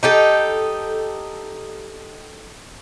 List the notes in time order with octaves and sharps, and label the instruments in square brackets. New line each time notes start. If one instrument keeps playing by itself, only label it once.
[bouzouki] D#4 G4 A4